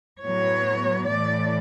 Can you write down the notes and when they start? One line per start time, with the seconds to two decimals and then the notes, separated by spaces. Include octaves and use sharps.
0.22 A2 F#3 B3 C#5
1.06 A2 E3 A3 D5